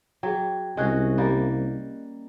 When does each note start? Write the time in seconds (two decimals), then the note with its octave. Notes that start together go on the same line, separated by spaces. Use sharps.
0.23 F#3 G#4 G5
0.77 C2 G#3 C#4 F#4 D#5 F#6
1.18 G3 A#3